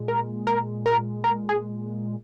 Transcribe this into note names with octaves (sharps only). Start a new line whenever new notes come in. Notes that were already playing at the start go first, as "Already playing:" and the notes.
Already playing: A#2 G#3
A#4
A#4
A#4
A#4
G#4